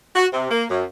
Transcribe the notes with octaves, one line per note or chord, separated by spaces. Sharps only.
F#4
C3
A#3
F#2